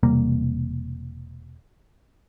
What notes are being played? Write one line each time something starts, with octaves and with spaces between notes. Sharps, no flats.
E1 C3 G3 A#3